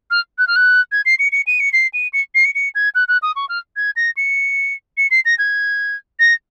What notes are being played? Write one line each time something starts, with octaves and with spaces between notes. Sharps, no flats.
F6
F#6
F6
F#6
G#6
C7
C#7
C#7
D#7
C#7
C7
D#7
C#7
C7
C#7
C#7
G#6
F#6
F#6
D#6
C#6
F6
G#6
A#6
C#7
C#7
C7
A#6
G#6
A#6